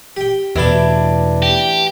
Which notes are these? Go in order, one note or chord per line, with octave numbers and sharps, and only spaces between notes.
G4 G5
A1 E2 B2 B3 D4 E4 D6
G4